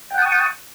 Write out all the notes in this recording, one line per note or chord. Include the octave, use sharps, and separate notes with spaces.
F#5 G5 A5 C#6 D#6